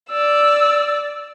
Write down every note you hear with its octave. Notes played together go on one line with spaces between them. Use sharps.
D5 E6